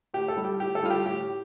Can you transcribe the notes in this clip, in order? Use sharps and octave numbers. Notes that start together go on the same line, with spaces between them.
A2 G4
A4
G3
G4
A2 G4
A4
G3 F4
G4
A2 G4